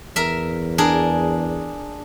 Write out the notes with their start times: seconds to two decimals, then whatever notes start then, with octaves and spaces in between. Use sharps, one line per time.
0.16 E2 A#4 E5
0.78 D4 G#4 A#4